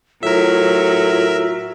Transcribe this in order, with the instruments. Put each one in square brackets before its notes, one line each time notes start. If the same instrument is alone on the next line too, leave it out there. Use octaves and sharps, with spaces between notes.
[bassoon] A2 [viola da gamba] F#3 [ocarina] F4 [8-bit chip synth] A#4 E5